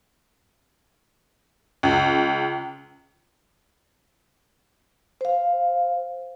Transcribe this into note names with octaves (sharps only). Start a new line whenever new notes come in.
C#2
C5 F5